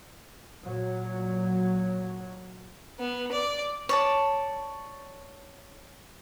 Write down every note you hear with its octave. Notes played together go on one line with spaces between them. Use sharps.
A#2 F#3
B3
D5
C#5 D5 A5